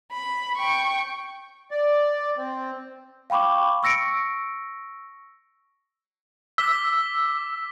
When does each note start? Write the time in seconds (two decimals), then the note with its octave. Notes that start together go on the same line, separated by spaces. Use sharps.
0.12 B5
0.58 G5 C#6
1.71 D5
2.37 C4
3.30 F5 G5 B5 C#6 D6
3.83 C#6 E6 A#6 C#7 D7
6.58 D6 E6 B6 G7